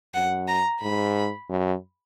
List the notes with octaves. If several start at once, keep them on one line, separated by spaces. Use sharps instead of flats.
F#2 F#5
A#5
G#2 B5
F#2